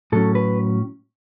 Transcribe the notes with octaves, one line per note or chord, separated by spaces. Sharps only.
A2 F#3 C#4 A4
B4